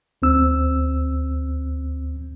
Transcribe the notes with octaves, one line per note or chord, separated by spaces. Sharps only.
D2 C4 E6